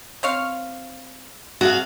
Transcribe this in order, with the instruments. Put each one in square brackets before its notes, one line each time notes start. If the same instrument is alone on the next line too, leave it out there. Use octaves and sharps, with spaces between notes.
[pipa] C4 C#5 F5
[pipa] C3 [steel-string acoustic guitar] F#4 G#4 F5